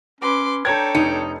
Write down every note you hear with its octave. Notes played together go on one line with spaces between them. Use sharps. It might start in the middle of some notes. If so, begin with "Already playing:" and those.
C#4 B4 C6 D6
D4 A4 C#5 G5 A#5 G6 G#6
F1 D#4 C#7